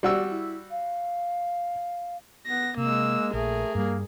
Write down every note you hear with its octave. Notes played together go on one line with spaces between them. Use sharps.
G3 F#4 D5 E6
E4
F5
B3 A#6
C3 G#3 A#3 E6
A#1 A3 G#4 A#4
G2 G3 A#3